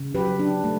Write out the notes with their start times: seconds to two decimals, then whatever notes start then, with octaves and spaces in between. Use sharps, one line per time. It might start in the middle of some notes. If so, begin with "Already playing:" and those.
Already playing: C#3
0.15 F#3 G4 B4
0.39 D4
0.64 A3